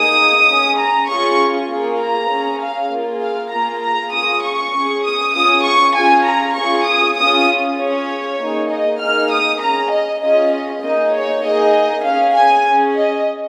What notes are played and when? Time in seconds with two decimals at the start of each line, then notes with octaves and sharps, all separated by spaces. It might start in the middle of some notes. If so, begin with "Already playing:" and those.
Already playing: A#3 D#4 G#4 D#6
0.48 C#4 G#4
0.78 A#5
1.08 C#4 F4 G#4 C#6
1.69 A#3 F4 G#4
2.00 A#5
2.30 C#4 G#4
2.60 F5
2.91 A#3 F4 G#4
3.22 F5
3.52 A#3 F4 G#4 A#5
3.82 A#5
4.13 C#4 F4 G#4 D#6
4.43 C#6
4.73 C#4 G#4
5.04 D#6
5.34 C#4 F4 G#4 D#6
5.65 C#6
5.95 C#4 F4 G#4 G#5
6.26 A#5
6.56 C#4 F4 G#4 C#6
6.86 D#6
7.17 C#4 F4 G#4 D#6
7.78 C#4 F4 G#4 C#5
8.39 A#3 D#4 G#4
8.69 D#5
8.99 A#3 D#4 G#4 F6
9.30 D#6
9.60 C#4 G#4 A#5
9.91 D#5
10.21 C#4 F4 G#4 D#5
10.52 D#5
10.82 A#3 D#4 G#4 D#5
11.13 C#5
11.43 A#3 D#4 G#4 D#5
12.04 C#4 G#4 F5
12.35 G#5
12.65 C#4 G#4
12.95 D#5